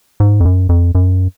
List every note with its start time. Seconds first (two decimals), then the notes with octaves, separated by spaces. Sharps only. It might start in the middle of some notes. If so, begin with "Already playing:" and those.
0.20 G#2
0.40 F2
0.45 F#2
0.69 F2
0.95 F#2